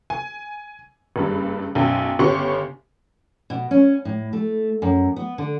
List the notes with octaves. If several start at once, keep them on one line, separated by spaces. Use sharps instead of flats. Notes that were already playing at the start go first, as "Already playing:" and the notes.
G#5
F#1 G2 G3
B1 F#2 G5
G1 C#3 B3 G4 C6 C#6
B2
C#4
A2
A3
F#2
B3
D3